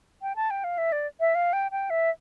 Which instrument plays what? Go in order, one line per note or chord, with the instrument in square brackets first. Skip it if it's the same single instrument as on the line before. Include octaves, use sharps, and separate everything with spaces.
[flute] G5
A5
G5
F5
E5
D5
E5
F5
G5
G5
E5